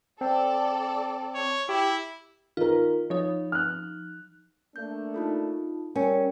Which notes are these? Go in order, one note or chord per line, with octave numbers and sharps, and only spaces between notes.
C4 A4 D5
C#5
E4 G4
D#3 F4 A#4
F3 D#4 C#5
F6 F#6
A3 A#3 D4 G6
D#4 F4 A4
G3 C#4 A#4 G5